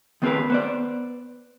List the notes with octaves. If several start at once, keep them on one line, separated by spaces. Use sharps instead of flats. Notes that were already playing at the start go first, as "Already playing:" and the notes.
D#3 B3 C4 G#4 A#4 B4
B3 C5 D5